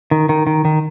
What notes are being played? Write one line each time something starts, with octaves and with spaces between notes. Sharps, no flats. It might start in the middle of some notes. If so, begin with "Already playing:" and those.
D#3
D#3
D#3
D#3